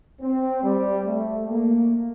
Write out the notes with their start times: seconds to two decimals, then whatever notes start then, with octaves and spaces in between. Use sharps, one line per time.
0.21 C4
0.63 G3
1.06 A3
1.48 A#3